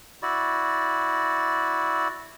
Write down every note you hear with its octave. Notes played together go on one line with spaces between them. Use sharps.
E4 F#4 D5